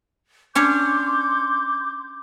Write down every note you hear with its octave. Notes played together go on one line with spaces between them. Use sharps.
C#4 D4 C#5 C6 D6 G6